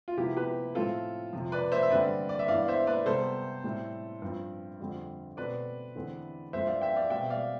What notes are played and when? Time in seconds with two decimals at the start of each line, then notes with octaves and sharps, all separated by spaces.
0.08 F4
0.17 C3 F3 B3 E4 G4
0.37 G4 B4
0.75 A2 F3 A3 C4 F4 A4
1.33 F2 C3 F3
1.52 B4 D5
1.72 C5 E5
1.83 E5
1.90 G2 D3 G3 C4 B4 D5
2.29 D5
2.39 E5
2.48 G2 E3 B3 D5 F5
2.68 C5 E5
2.87 B4 D5
3.06 C3 G3 B3 A4 C5
3.64 A2 G3 C4
4.22 G2 F3 C4
4.80 F2 D3 G3 C4
5.37 B2 A3 C4 B4 D5
5.96 E2 D3 A3 C4
6.53 G2 F3 A3 C4 C5 E5
6.67 D5 F5
6.81 E5 G5
6.96 D5 F5
7.10 B2 G3 C4 E5 G5
7.30 D5 F5